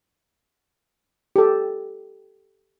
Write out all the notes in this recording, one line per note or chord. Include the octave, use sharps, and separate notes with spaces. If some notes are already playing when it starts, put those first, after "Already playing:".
G4 A4